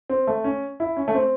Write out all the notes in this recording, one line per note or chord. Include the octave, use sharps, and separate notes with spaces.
C4
A3
C#4
E4
C#4
A3
C4